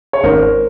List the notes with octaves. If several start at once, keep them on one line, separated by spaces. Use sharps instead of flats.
C#5
G#1 A#4 C5